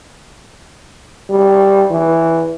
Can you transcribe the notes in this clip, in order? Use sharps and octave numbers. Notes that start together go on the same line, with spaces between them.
G3
E3